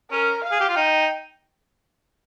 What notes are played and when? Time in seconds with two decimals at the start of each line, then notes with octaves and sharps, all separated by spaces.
0.11 C#4 A#4
0.44 F5
0.52 G#4
0.60 G4
0.69 F4
0.76 D#4 G5